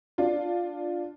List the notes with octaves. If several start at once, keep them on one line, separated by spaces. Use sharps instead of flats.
D4 F4 D5